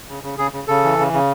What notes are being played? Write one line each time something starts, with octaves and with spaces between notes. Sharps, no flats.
C#3
C#3
C#3 G#4
C#3
C#3 A4
E3
C#3
C#3